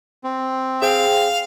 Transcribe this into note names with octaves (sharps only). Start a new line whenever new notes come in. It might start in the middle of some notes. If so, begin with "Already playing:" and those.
C4
G#4 C5 F5 G5